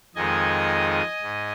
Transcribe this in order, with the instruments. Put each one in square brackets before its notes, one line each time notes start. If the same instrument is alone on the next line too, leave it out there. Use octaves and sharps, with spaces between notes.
[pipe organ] F2 D#3 G#3 D#5 G#5
G#2